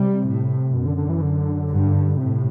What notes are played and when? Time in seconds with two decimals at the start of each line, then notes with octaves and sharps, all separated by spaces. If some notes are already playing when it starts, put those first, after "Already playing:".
Already playing: C3 G3
0.25 A2
0.73 F#2 B2
0.86 D3
0.97 D3
1.09 E3
1.22 D3
1.69 G2
2.17 A2 C3